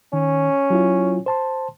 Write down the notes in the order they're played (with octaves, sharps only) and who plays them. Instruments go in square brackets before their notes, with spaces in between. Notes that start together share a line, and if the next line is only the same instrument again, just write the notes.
[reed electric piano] D#3 [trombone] C#4
[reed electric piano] F#3 E4 F4
C5 A5 C6